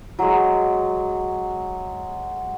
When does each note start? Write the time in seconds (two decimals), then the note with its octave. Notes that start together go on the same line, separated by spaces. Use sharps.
0.19 F#3 G#3